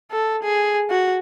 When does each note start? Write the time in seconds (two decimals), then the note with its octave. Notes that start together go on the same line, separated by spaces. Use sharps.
0.11 A4
0.43 G#4
0.90 F#4